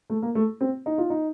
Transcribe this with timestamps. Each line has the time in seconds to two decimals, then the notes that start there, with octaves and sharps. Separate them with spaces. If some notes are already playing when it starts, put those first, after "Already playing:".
0.10 A3
0.22 A#3
0.35 A3
0.61 C4
0.86 D#4
0.98 F4
1.10 D#4